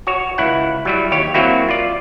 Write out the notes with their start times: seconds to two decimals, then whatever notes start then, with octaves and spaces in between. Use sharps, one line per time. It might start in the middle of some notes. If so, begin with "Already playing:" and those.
0.07 F#4 C#5
0.38 C#2 E4 F#5
0.85 F#3 G3 E4
1.11 D#2 G4 C#5
1.34 F#3 A#3 C4 E4 F#4
1.69 F4 D5